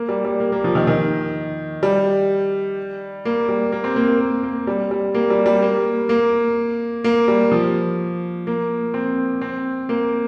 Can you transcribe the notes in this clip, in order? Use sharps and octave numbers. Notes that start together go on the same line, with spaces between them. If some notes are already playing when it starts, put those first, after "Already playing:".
Already playing: A#3
G3
G3
A#3
A#3
F3
D#3
D#3
G3
A#3
G3
A#3
C4
A#3
A#3
A#3
A#3
G3
G3
A#3
G3
G3
A#3
A#3
A#3
G3
F3
A#3
C4
C4
A#3